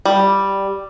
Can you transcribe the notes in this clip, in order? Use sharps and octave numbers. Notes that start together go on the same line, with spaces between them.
G3